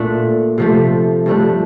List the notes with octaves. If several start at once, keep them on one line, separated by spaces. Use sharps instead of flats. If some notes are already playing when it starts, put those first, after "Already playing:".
Already playing: A#2 A3 D4
C3 F3 A3
G2 F3 A3 D4